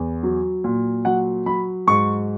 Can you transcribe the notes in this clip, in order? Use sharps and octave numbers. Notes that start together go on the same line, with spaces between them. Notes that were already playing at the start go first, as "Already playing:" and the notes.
Already playing: E2
F#3
A#2
F#3 F#5
F#3 B5
G#2 C#6